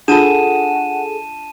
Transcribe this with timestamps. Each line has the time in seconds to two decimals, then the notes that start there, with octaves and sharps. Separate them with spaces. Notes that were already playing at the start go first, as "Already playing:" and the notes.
0.08 D4 F4 G#4 A4 F#5 A5 D#7 E7